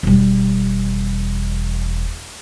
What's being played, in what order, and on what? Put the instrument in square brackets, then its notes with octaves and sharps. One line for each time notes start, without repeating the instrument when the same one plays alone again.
[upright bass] E1 G3